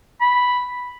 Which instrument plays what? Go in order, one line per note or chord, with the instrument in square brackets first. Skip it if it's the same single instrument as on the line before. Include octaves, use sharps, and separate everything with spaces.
[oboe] B5